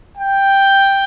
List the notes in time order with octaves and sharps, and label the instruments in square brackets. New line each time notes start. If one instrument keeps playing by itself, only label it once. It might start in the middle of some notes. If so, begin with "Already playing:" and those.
[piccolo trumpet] G5